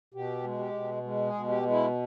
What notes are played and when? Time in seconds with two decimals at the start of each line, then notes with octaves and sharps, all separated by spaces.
0.14 B2 G4
0.43 G#3
0.59 G4
0.73 B2
1.03 G#3
1.26 G#4
1.34 B2
1.49 G4
1.63 G#3
1.71 E4